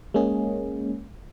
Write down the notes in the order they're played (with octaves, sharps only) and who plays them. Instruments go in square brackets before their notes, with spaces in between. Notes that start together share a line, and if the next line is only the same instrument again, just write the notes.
[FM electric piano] G#3 A#3 C#4 G#4